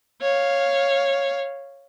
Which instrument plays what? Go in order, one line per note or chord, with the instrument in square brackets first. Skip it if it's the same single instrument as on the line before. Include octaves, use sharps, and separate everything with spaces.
[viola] C#5 F5